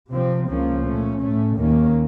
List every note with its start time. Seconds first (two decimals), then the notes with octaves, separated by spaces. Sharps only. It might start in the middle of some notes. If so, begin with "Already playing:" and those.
0.11 C3 F3 C4
0.48 C#2 C#3 F3 A#3 C#4
0.84 A#2 A3 C#4
1.21 A2 A3 C#4
1.59 D#2 D#3 A#3 C#4